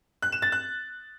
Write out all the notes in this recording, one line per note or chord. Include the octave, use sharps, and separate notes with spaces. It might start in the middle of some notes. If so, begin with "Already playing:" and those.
F#6
E7
A6
F#6